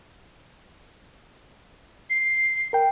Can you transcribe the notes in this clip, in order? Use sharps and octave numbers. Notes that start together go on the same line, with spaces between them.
C7
A#4 G5